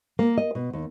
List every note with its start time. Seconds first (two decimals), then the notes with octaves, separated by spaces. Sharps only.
0.19 A#3
0.38 D#5
0.55 B2
0.73 D#2